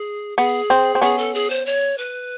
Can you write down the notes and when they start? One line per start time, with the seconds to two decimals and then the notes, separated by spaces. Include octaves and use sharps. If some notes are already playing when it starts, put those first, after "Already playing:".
Already playing: G#4
0.37 B3 G#4
0.70 C4
0.95 C4
1.01 B3 C#4 G#4
1.18 A4
1.34 G#4
1.50 C5
1.65 C#5
1.97 B4